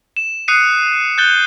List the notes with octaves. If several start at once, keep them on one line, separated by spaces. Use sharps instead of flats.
E7
D#6 F#6 C7 C#7 D#7
F#6 G6 A6 G7